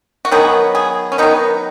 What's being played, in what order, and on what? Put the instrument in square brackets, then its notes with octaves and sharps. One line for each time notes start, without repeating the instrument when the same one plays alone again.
[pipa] F#4
D#3 F#3 B3 G#4
G#4
C#4
D#3 F#3 B3 D#4